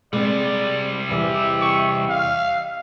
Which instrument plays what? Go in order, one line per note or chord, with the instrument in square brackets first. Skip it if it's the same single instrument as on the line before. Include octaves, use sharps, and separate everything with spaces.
[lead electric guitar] C3 G3 [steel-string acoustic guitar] G#3 C4 [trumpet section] D5
[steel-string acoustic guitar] E2 E3 D#5 [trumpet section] G4 E5
[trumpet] C#6
F5